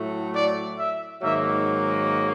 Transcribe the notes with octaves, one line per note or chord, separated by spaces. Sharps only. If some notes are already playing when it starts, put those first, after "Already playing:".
Already playing: A2 F#3 A3
D5
E5
G#2 D#3 F#3 A#3 E5